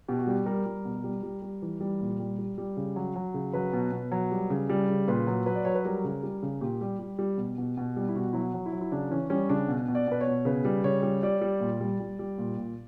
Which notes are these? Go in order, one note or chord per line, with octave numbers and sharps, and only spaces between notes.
B2 G4
F#4
G3 G4
G3 A#4
G3
B2
G3
G3
G3
E3
G3
A#2
G3
G3
G3
C#3
F#3
F#3
C#3
F#3 B4
B2
B2
F#3
G3
C#3
G3
C#3
A#2 B4
F#3
F#3 B4
D5
F#3 C#5
B4
G3 A#4
C#3
G3
C#3
A#2 G4
G3
G3
G3
B2
B2
B2
G3
E4
B2 F#4
F#3 E4
F#4
F#3
E4
F#3
E4
C#3 D4
E3 C#4
G3 C#4
C#3 D4
B2
B2
D5
B2 B4
C#5
B2
C#3 B4
G3
C#3 C#5
G3
G3 D5
G3
A#2
G3
G3
G3
A#2
A#2